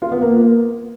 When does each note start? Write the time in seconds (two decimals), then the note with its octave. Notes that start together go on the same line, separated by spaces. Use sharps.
0.02 F4
0.11 B3
0.21 A#3